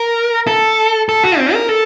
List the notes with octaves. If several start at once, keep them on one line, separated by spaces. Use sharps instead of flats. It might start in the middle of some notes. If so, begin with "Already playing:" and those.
Already playing: A#4
A4
A4
F#4
C4
A#4
A4